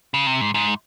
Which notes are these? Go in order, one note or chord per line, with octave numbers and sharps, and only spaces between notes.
C#3
C3
G#2
G#2